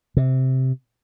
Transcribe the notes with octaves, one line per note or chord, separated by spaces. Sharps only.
C3